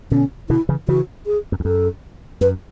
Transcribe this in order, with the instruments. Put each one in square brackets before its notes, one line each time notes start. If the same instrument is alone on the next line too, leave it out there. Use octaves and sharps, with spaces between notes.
[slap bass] B2 D3 [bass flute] C#4
[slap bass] B2 D3 [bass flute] E4
[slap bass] C#3 E3
[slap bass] C#3 E3 [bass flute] F#4
[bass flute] G#4
[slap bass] F#2
E2
[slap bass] F#2 [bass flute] A4
[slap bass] F#2 [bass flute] B4